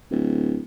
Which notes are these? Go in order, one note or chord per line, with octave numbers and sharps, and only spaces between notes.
D1